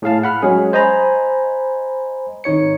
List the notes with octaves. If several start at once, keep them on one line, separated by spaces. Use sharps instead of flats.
A2 G#4 F5 A5
F#5 B5 F6
F#3 G#3 C#4 G#4
C5 D#5 G#5 A#5 B5
G#1 D#4 C#5 C#7